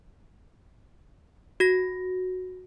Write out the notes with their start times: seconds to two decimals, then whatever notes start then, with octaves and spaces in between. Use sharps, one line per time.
1.60 F#4 A#6